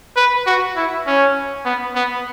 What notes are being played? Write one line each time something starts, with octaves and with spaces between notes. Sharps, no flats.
B4
F#4
E4
C#4
B3
B3